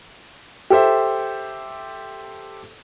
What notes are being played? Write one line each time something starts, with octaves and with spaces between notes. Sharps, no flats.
G4 A4 C5 E5